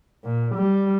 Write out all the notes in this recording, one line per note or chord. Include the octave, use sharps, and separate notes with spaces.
A#2
G3